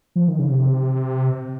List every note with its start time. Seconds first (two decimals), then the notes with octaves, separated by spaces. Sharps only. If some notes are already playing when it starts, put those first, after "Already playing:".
0.16 F3
0.28 D#3
0.39 C#3
0.51 C3